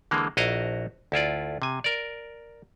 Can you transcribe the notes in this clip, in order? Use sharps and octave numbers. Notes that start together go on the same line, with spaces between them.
D3 E3 G#3 A#3
A#1 E4 F#4 D#5 F5 A#5
D2 E4 F4 D5
C3 G#5
A#4 D5